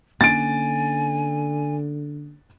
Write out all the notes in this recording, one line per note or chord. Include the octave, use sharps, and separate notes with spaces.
D3 A#3 C#4 D4 G#5 A6 D7